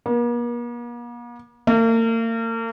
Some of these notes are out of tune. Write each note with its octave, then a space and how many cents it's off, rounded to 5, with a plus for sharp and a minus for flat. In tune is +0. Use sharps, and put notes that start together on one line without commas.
A#3 +45
A#3 -40